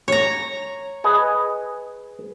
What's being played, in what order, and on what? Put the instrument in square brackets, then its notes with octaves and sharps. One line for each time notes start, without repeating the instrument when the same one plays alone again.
[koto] C#5 A#5
[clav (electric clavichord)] G#4 B4 D#5